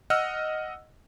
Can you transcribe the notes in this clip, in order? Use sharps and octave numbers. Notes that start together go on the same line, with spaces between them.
D#5 F#5 E6 F6